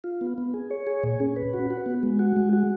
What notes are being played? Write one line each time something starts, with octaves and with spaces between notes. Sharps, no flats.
F4
B3
B3
G#4
C#5
G#4
A#2
C#4
B4
F#4
F#4
B3
G#3
F#4
G#3
F#4